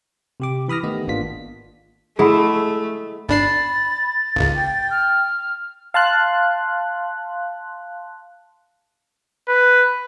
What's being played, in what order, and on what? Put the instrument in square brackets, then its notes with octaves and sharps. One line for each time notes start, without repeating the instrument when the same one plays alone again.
[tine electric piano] C3 G4 D6
E3 B5 D#6 F6 A#6
D#3 A3 B3 G4 D#5
G#1 A#3 B3 D4 F4 B6
[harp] G#3 E4 [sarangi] A3 [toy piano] G#4 F#5 B5
[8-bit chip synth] G1 D4 C7 [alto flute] B5 [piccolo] A6
[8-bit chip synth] G#1 C#2 [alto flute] F5
[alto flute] G5
[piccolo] F6
[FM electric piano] F5 A5 C6 F#6
[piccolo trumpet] B4